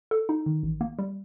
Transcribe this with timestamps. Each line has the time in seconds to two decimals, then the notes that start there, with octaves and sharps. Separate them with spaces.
0.11 A4
0.29 D#4
0.46 D#3
0.63 A1
0.81 A#3
0.99 G3